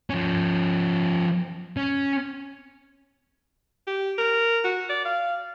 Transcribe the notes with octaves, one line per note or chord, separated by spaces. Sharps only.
F3 C#4
C#4
G4
A#4
F#4
D5
F5